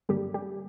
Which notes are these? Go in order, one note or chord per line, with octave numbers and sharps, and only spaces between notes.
G2 D3 F#3 G3 A#3 D4 G4
G3 G4